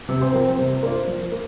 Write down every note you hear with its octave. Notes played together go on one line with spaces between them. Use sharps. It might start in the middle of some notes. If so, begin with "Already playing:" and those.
C3
C5
F3 C4 A#4
C5
C3 C5
A#3 D4 F4 C5
F3
A#3